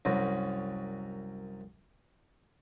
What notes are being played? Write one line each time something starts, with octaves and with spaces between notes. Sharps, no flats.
C2 F#2